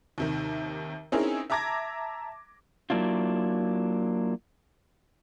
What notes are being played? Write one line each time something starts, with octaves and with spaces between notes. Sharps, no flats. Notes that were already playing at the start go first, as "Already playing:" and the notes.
D#2 C3 D#3
C4 C#4 D#4 E4 G#4 A#4
E5 A5 A#5 D6 G#6 A#6
F#3 A#3 D4 E4 F4